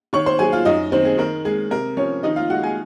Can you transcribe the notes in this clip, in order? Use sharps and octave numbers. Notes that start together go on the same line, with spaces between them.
D#3 C#5 C#6
C5 C6
F#3 G#4 G#5
F4 F5
F#2 D#4 D#5
D#3 C4 C5
G#4
D#3 A#4
G#3 G#4
C3 A#4
F3 C#4 C#5
D#3 D#4 D#5
F4 F5
G#3 F#4 F#5
G#4 G#5